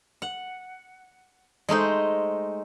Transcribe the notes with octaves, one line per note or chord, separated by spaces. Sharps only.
F#5
G#3 A3 D#4 C5